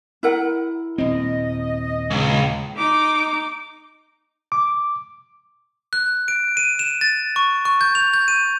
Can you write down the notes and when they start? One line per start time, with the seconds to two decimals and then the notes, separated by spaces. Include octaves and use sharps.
0.23 E4 A#4 F#5
0.98 D#1 C4 D#5
2.11 C#2
2.76 D#4 D6
4.52 D6
5.93 F#6
6.28 D7
6.57 D#7
6.79 E7
7.01 A6
7.36 C#6
7.65 C#6
7.81 G6
7.95 F7
8.14 G6
8.28 D#7